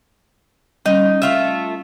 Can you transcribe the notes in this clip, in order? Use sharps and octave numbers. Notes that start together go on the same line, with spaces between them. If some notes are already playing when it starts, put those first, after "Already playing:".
G3 C#4 D#4
A3 F4 E5